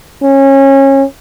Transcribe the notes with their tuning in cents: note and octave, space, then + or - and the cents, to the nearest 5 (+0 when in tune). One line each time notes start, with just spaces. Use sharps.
C#4 -25